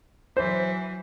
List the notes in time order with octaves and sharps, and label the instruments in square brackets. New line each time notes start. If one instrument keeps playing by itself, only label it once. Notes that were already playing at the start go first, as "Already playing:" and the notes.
[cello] E3 F#3 [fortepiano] C5